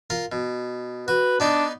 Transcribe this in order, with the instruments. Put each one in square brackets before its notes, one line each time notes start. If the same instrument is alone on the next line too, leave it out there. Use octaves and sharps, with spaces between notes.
[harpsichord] F4 A#4
B2
[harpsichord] F#4 [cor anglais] B4
[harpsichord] B3 D#4 D5 [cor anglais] D4